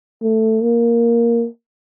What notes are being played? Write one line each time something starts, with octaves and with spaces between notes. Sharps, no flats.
A3
A#3